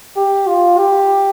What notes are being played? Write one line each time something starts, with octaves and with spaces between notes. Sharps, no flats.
G4
F4
G4